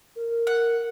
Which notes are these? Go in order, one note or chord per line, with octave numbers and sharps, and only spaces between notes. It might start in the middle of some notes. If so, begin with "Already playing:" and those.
A#4
F#5